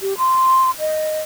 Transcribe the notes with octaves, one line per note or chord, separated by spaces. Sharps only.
G4
C6
D#5